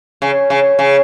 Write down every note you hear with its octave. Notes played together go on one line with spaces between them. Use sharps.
C#3
C#3
C#3